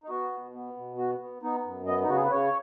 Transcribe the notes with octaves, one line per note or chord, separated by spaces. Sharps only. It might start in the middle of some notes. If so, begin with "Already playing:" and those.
D#4
B3 F#4
B2
B3
B2
B3 F#4
B3
B3 D#4
F#2
B3 D#5
D#4
C#3 F#4
G#4
B4
C#3 C#5